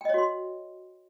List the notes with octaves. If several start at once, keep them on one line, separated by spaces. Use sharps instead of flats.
F#4 C#5 D#5 G5 C6